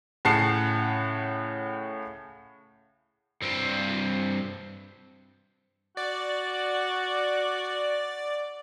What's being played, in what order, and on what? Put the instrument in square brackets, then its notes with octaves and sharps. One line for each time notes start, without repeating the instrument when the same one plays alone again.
[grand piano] A2 C#3 F#5 A5 C7
[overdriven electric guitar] G2 C4
[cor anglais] F#4 [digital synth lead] D5